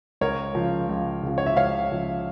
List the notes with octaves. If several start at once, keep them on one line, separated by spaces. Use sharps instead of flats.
C#2 A#4 C#5
C#3 F3
C#2
C#3 F3
C#5
E5
C#2 C#5 F5
C#3 F3